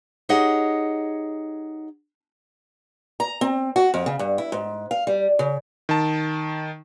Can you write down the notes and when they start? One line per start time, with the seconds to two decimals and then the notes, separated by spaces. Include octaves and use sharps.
0.29 D#4 G4 G#4 C#5 D#5 F#5
3.20 A#5
3.41 C4
3.76 F#4
3.94 F2
4.06 C#3
4.19 G2
4.38 E4
4.52 G#2
4.91 F5
5.07 G3
5.39 C#3
5.89 D#3 A5